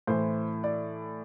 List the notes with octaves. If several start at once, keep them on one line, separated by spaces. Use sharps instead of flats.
A2 E3 C5
D5